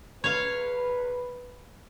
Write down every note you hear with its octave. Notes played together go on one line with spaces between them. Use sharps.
B4 C#5 F5